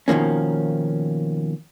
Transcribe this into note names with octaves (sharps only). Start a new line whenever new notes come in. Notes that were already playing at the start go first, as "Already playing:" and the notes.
B2 D#3 F3 A#3 C#4